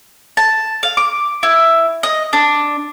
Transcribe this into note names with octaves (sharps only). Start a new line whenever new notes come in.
A5
F5
D6
E4
D#5
D4